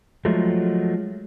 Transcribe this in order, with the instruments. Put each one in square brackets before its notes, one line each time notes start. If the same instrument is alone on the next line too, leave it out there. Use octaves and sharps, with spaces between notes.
[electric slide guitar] F3 F#3 G#3 A3